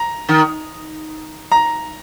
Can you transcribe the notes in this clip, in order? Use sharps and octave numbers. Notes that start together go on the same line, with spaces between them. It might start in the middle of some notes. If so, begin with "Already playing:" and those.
Already playing: A#5
D#3
A#5